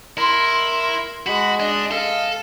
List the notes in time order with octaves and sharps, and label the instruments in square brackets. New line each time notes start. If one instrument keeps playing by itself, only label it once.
[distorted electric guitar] E4 [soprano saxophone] A#4 [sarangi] C6
[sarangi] G#3 [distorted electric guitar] F#4 [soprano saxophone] B5
[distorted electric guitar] D4 [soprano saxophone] D#5
[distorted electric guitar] A4 [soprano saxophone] D#5 [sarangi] F5